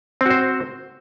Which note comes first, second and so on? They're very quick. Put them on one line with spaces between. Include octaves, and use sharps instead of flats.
C4 F#4 C5